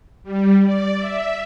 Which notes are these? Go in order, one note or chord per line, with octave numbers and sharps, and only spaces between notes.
G3
D5
E5